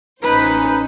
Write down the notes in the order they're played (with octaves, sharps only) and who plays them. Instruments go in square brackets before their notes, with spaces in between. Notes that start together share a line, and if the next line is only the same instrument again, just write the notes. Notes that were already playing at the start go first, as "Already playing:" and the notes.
[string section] A1 C#4 C5 [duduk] D#4 [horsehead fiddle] B4